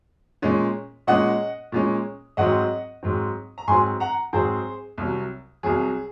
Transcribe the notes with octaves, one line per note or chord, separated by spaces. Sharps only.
A#2 G#3 C#4
A#2 G#3 C#4 D#5 F#5
A#2 G#3 C#4
G#2 F#3 C4 D#5 F#5
G#2 F#3 C4
A#5
G#2 F#3 C4 G#5 C6
F#5 A#5
G#2 F#3 C4 G#4 C5
C2 C3 F#3
C2 C3 F#3 G#4